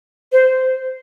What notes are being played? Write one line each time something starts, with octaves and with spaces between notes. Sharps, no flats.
C5